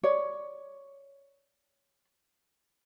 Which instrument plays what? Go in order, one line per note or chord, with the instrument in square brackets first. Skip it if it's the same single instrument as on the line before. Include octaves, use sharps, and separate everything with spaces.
[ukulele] C#5 D5